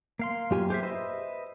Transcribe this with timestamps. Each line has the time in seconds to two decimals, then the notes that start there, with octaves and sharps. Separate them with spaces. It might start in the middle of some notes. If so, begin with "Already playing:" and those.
0.19 A#3 F5 C6
0.51 F#2 F4 G4 G#5
0.70 G4 G#4 C5 E5
0.83 B4 C5 D#5 E5